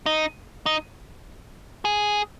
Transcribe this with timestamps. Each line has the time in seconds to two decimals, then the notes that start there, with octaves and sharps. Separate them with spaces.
0.06 D#4
0.66 D#4
1.85 G#4